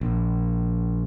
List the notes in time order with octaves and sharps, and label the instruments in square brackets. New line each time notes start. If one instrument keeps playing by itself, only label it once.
[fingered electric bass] A#1